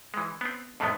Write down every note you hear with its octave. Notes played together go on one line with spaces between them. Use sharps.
E3 G#3
B3 C4
F2 A2 D#3 G#3 A3 B3